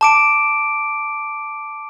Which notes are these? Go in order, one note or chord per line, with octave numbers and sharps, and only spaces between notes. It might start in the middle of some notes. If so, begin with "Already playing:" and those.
A5 D6 D7